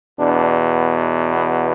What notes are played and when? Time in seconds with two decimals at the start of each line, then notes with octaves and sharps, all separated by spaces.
0.19 E2 B2 D4
1.35 B3